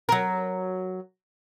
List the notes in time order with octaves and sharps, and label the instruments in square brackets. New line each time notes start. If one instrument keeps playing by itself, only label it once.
[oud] F#3 A#4